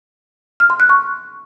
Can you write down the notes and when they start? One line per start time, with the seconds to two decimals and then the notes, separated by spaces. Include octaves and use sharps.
0.60 F6
0.70 C6
0.80 F#6
0.89 C#6